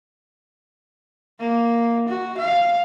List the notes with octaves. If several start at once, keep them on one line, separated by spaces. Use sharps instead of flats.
A#3
F#4
F5